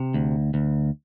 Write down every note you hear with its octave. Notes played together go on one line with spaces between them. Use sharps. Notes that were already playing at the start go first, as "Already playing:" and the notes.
Already playing: C3
D2
D2